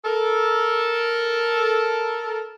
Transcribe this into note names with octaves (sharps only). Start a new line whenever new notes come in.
A4 A#4